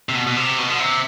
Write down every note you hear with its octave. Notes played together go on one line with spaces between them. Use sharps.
C3
B2
B2
C3
B2
D3
C3